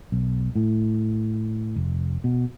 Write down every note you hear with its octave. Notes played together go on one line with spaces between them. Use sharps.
B1
A2
F1
B2